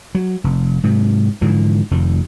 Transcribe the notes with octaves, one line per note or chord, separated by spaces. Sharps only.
F#3
F1
G#2 C3 F#3
G#2 D3 E3 F3
F1 F2 D#3